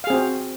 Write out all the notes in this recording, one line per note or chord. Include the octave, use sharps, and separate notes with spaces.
C4 F#4 G#4 F5